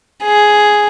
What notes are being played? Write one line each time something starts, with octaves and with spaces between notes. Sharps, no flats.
G#4